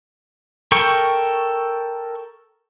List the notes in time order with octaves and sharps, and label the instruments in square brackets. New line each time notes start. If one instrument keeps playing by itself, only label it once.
[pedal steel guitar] A4 A#4 G5 C#6